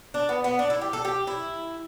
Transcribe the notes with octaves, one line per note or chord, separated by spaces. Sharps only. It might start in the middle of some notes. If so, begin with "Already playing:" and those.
D4
B3
B3
D4
E4
G4
A4
G4
E4